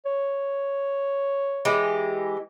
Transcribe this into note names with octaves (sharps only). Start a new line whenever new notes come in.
C#5
E3 G#3 G4